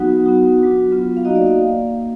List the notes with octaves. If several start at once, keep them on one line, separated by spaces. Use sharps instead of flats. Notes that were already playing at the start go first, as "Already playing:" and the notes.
Already playing: F#3 B3 D#4 F#4 F#5
B3 D#4 F#4
F#3 D4 F#4
F#3 B3 F4
F5
A#3 D#4 F#4 D#5
D5
F5
A#3